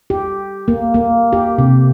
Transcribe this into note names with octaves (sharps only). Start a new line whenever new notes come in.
G4
A#3
A#3
G4
C3